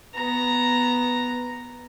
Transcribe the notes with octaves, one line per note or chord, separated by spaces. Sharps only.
B3 A#5